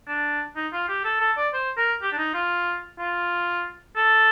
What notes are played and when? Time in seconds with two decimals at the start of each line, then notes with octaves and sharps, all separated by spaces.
0.07 D4
0.56 D#4
0.73 F4
0.89 G4
1.04 A4
1.20 A4
1.37 D5
1.53 C5
1.77 A#4
2.02 G4
2.12 D4
2.18 D#4
2.34 F4
2.99 F4
3.96 A4